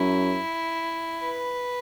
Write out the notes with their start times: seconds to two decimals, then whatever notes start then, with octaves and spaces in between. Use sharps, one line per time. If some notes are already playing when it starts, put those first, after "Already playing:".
Already playing: F#2 E4
1.20 B4